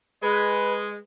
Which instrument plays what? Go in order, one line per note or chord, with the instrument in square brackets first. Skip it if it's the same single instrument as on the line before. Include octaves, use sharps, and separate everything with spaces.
[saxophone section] G#3 [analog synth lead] B4